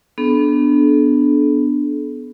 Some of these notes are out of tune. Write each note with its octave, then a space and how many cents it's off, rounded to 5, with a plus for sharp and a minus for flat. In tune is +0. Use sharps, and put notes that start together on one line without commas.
B3 +5 D4 +0 A4 -40